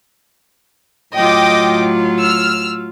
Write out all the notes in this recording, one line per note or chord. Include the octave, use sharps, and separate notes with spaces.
A2 F#3 F4 D#5 G5 D6
E6 F6